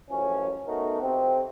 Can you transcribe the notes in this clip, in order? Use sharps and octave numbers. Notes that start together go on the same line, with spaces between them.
A1 F#2 F3 C#4
A3 B3 D#4 F#4 A#4
F2 C3 C4